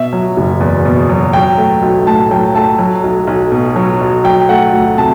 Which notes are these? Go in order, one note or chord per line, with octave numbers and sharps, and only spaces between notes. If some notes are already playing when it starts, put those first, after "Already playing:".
Already playing: B2 E5
F#3
F#1
E2
B2
F#3
F#3 G5
A3
B1
A2 A5
F#3 G5
A3 A5
F#3
B1
B1
B2
F#3
B1
F#3 G5
A3 F#5
D2
C3 A5